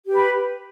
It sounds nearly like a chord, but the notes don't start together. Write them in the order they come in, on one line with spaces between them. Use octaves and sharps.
G4 B4 B5